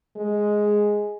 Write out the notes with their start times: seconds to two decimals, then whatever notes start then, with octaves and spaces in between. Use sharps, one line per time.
0.16 G#3